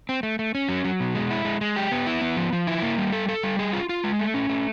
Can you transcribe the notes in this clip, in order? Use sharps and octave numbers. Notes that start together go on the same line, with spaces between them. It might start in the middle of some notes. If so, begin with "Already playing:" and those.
C4
A3
A3
C#4
F#3
F#3
B2
G#3
E4
G#3
G#3
G4
B3
E4
B3
F3
F3
E4
A#3
G3
A4
A4
G3
G#4
F4
F4
G#3
A3
C#4
A3